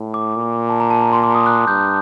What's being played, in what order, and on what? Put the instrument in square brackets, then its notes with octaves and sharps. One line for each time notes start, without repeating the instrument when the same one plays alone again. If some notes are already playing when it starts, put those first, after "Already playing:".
Already playing: [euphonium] A2
[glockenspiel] D6
[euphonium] A#2
[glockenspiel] A5
A#5
A5
A#5
C6
D6
D#6
F#6
[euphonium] G2 [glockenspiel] G6